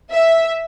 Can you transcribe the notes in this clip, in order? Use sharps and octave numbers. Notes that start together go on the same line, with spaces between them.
E5